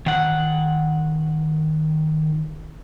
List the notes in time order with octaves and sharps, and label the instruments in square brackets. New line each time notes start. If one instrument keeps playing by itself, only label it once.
[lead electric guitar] D#3 F#5